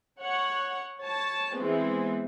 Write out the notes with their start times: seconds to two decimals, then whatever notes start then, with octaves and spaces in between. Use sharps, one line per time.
0.20 C#5 F#5
0.98 C#5 A5
1.56 E3 G#3 B3 C4